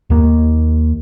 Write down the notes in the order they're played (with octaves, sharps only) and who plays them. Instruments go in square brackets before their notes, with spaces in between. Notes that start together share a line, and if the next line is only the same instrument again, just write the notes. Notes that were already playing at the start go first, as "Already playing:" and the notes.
[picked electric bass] D#2 A#3